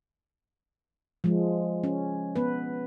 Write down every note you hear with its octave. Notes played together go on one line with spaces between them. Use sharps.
F3 G#3
C#4
B3 B4